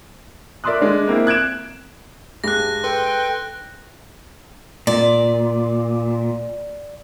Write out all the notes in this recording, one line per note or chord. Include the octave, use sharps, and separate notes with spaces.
A#4 D5 E5 C6 D#6 F#6
G#3 D4
A#3 C4 E4
F#6 G#6 D7 E7
G2 G#3 G4 F#6 A#6
A4 B4 G5 C6
A#2 D5